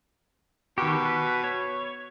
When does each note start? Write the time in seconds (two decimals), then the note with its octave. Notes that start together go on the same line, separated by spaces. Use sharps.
0.78 B2 D#3 G4
1.05 B4
1.44 C#5